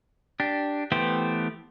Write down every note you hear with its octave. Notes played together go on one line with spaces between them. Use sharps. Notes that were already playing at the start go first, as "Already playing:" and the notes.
D4 G4
E3 A3 B3 G4 C5